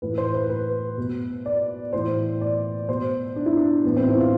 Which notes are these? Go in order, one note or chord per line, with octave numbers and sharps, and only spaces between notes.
A2 E3 B4
C5
B4
B4
B2
D5
A2 E3 C5
D5
B2 C5
D4
E4
D4
A2 E3 B3
C4
E4
F4